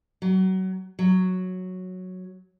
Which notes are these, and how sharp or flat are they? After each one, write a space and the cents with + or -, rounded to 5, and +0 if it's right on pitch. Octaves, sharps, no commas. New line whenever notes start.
F#3 +25
F#3 -5